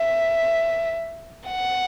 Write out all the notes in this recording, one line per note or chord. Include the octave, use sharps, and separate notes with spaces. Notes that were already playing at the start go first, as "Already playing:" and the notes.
Already playing: E5
F#5